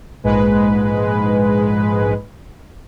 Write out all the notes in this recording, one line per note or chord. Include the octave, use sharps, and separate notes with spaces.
A#1 G#2 G#3 B4